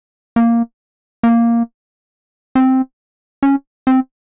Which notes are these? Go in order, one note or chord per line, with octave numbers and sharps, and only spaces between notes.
A#3
A#3
C4
C#4
C4